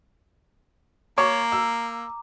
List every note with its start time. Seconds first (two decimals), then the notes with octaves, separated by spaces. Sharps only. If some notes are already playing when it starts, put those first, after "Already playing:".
1.18 A#3 C#5 A#5 C#6 D6
1.52 E6